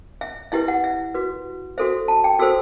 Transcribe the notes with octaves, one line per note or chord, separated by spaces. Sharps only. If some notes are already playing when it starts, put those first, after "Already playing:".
E5
E4 G4 B4 E5
F#5
E5
F#4 B4
F#4 A4 C5 E5
A5
G5
F#4 A4 C5 E6